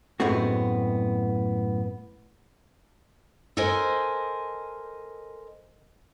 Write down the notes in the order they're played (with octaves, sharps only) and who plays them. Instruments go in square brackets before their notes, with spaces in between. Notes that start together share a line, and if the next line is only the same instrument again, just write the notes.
[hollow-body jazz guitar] F#2 A2 G#3 B3 C4 F#4
[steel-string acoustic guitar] A4 A#4 C5 D#5 G#5